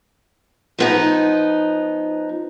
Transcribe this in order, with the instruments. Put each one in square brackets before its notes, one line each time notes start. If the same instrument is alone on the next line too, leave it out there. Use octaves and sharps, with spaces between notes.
[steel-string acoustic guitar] F3 B3 D#4